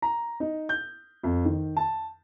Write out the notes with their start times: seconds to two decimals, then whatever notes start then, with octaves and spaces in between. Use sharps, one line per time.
0.02 A#5
0.40 D#4
0.69 G6
1.24 F2
1.45 D#3
1.77 A5